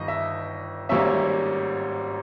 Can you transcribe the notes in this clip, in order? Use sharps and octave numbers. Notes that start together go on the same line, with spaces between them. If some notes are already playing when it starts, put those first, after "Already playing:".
Already playing: G1 G2 D#3 D#5
E5
G#1 G#2 G3 A#3 C#4 E5
E5